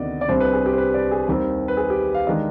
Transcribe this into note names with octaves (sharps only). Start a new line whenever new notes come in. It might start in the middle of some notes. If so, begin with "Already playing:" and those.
Already playing: D2 C3 D#3 B3 D4 D5 D#5
D5
C2 C3 G3 D4 C5
B4
G#4
G4
C5
B4
D5
G#4
D#2 D#3 G3 C4
B4
G#4
G4
F5
D#3 G#3 D4 D#5